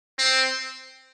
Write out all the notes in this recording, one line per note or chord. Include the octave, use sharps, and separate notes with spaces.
C4